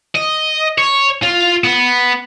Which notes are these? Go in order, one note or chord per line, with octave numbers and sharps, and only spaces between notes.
D#5
C#5
F4
B3